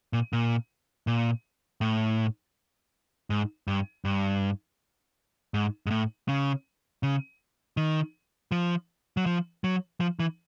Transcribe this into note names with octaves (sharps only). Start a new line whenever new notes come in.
A#2
A#2
A#2
A2
G#2
G2
G2
G#2
G#2
A2
C#3
C#3
D#3
F3
F#3
F3
F#3
F3
E3